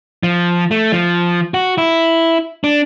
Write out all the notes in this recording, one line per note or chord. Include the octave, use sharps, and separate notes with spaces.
F3
A3
F3
F#4
E4
D4